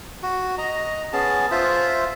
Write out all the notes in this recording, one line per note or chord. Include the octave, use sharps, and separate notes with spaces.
F#4
D#5 A#5
B3 C#4 G#4 A5
F4 C5 E5